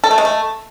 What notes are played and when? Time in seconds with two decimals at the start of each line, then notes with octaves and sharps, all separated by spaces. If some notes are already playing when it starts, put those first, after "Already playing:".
0.04 A4
0.11 A3
0.18 G#3
0.25 A3